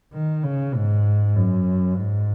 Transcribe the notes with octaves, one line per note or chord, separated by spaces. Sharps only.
D#3
C#3
G#2
F#2
G#2